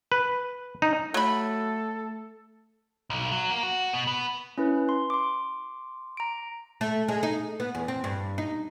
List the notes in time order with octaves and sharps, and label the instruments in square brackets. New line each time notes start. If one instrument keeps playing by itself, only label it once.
[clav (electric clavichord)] B4
D#4
[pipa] F#3 B5 [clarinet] A3 [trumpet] A4
[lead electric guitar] B1
F#3
A#3
F#4
B2
B3
[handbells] C#4 E4 B4
C6
C6 D6
A#5 D7
[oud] A3
G#3
D#4
B3
E2
C4
G2
D#4